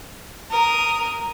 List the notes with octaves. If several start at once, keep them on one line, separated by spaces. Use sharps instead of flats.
A#4 D#6